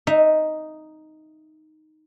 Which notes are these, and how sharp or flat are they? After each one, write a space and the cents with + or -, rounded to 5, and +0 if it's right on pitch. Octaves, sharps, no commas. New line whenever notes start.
D#4 +0 E5 +0